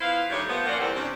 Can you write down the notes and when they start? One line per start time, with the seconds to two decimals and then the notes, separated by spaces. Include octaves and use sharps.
0.01 B3 E4 F4 C5 F5
0.30 D#3 G3 A3 D4 G4 C#5
0.48 F3 B3
0.65 F3 A#3 C#4 F4 D5 F#5
0.79 E2 G3 C4
0.95 C3 C#4 D4